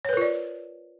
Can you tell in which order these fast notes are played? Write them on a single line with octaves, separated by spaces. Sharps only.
C#5 B4 A#4 F4 D5